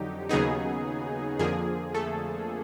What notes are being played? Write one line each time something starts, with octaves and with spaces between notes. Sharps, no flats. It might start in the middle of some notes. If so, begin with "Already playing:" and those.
Already playing: F2 D3 F#3 D#4 G4
D#2 C#3 F#3 B3 D#4 G#4
F2 D3 F3 A#3 G#4
A3 A4